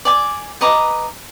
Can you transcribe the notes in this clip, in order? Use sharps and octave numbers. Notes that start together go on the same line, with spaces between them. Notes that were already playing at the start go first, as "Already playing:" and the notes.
D5 G#5 D6
B4 D#5 A#5 D6